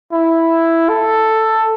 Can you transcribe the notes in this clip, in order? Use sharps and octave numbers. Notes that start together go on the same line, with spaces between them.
E4
A4